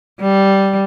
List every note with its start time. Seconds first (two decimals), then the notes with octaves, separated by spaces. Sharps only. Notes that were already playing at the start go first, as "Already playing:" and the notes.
0.21 G3